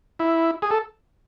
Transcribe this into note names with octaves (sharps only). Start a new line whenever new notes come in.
E4
G#4
A4